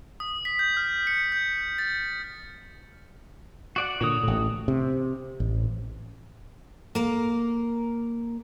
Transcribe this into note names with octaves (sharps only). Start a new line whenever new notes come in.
D#6
B6
G6
F6
C#7
G6
A6
F#4 D5 F#5
A#2 D3 F#4 C#5 D#6
A1 A2
C3
A1
A#3 A#4